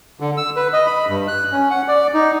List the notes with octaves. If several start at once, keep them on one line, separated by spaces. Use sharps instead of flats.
D3
E6
B4
D#5
B5
G2
F#6
C#4
F#5
D5
D#4